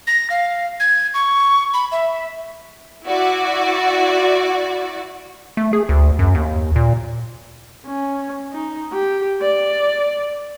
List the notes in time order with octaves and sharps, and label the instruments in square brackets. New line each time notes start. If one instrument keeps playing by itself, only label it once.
[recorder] A#6
F5
G#6
C#6
B5
E5
[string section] E4 F#4 D5
[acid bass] A3
G#4
D2
F#2
D#2
A#2
[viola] C#4
D#4
G4
D5